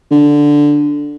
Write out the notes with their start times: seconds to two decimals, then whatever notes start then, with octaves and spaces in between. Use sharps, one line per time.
0.11 D3